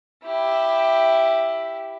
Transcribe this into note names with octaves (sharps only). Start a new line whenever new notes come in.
E4 G4